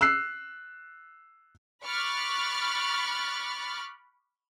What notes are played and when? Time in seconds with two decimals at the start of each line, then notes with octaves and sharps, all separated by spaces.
0.01 E6 F#6 C7
1.84 B5 C#6 D6 F6 F#6 A6